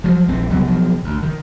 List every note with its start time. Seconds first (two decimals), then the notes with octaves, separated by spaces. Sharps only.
0.04 F3 F#3
0.28 A#1 E3 C4
0.50 C2 B2 F#3 G3
0.67 B2 F3 F#3
1.04 D2
1.23 D#3